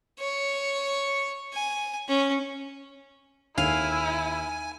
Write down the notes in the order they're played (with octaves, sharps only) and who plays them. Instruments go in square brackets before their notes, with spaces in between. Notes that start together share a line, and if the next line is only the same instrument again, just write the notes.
[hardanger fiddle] C#5
G#5
C#4
[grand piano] D#2 [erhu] E4 [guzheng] F5 [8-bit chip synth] G#5